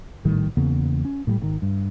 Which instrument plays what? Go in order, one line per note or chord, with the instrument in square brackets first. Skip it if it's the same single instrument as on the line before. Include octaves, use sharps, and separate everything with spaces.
[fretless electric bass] A#1 A2 D#3 G3
E2 C#3 A#3 B3
C#4
A2 F#3 G3
G#1 C3 D#3
G2